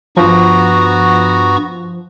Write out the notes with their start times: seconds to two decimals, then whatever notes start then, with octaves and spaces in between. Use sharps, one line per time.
0.17 G2 F3 B3 F#4 A#5 C#6